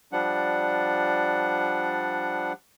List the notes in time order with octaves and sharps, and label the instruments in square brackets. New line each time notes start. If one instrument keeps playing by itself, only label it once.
[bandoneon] F3 G3 D4 F#5